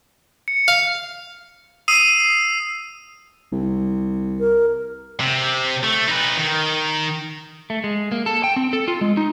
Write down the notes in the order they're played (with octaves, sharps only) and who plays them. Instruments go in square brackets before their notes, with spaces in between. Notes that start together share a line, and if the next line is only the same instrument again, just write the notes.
[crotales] C#7
[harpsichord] F5
[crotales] D#6 E6 C7 D#7
[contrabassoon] C2
[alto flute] A#4
[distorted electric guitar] C3
A3
D#4 B4
D#3
[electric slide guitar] A3
G#3
A#3
A4
G5
C4
A4
F4
G#3
D#4